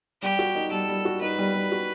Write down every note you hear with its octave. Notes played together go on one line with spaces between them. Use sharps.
G3 G4
F#4
D#4
G3 A4
G3
F#4
D#4 B4
G3
G3
F#4